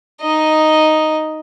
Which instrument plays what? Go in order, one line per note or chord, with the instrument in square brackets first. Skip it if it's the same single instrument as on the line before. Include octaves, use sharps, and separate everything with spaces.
[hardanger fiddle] D#4 D#5